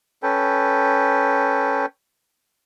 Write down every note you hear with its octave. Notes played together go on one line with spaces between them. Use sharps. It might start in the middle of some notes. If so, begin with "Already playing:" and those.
C#4 A4 B4 G5